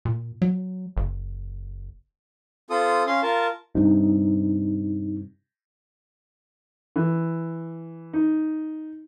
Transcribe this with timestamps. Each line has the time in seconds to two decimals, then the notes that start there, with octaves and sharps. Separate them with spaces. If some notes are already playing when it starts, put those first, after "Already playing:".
0.05 A#2
0.42 F#3
0.97 F#1
2.70 C4 F4 A4 D#6
3.07 C#4 F5 C6
3.22 F4 A#4 A5
3.75 G2 C3 D#4
6.96 E3
8.13 D#4